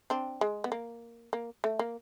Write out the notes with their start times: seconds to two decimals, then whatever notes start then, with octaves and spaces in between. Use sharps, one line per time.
0.10 C4 D4
0.41 G#3
0.64 B3
0.72 A#3
1.33 A#3
1.64 A3
1.79 A#3